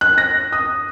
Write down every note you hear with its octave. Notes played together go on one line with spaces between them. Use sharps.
F#6
A#6
D#6